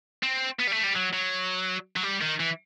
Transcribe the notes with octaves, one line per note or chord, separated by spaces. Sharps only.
C4
B3
G3
A3
G3
F#3
F#3
F#3
G3
D#3
E3